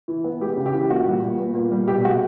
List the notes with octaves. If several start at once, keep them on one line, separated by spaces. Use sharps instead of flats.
E3
B3
G#3 G4
C#3
G4
E3
A#2 F#4
G3
A#2
B3
A#2
G3
B2 G4
G#3 F#4